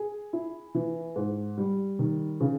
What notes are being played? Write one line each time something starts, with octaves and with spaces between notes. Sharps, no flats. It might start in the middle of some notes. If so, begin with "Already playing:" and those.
Already playing: G#4
E4
E3
G#2
G3
D#3
C#3